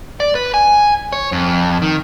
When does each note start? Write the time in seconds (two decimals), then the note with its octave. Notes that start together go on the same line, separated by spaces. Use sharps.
0.20 D5
0.35 B4
0.54 G#5
1.13 C#5
1.32 F2
1.82 D#3